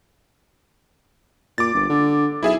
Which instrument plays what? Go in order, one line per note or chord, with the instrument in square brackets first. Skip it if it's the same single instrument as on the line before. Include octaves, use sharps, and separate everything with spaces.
[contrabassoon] A#2 [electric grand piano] D6 A6
[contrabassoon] G1
D3
[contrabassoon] B1 [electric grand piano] E4 G#4 E5